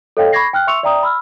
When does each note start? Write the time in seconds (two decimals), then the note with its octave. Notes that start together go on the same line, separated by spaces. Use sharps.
0.17 A4 C#5 D#5 F5 G5
0.33 B5 C#6 D6 G#6 A#6 C7
0.53 G5 F6 F#6
0.67 E5 C6 C#6 E6 C#7 F7
0.83 D5 E5 G5 A#5 D#6
1.03 B5 E6 F6